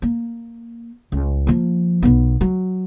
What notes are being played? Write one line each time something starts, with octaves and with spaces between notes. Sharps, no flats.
A#3
C#2
F3 A#3
B1 B3
F#3